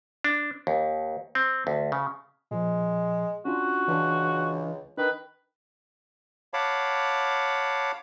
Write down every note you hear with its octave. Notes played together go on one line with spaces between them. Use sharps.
D4
D#2
C4
D2
C#3
A#2 F3 G#3
C#4 D4 F4 F#4
C#2 E3 D4
D#3 D4 B4
C#5 F5 F#5 A5 B5 D6